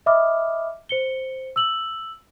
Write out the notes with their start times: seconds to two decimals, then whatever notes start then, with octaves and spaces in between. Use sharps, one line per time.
0.06 D#5 E5 B5 D6 D#6 F6
0.89 C5 C#7 G7
1.56 E6 F#7